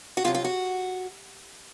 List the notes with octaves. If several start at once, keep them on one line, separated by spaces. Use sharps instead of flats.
F#4
F2 C3 D#3 F#3 F4
F4
F#4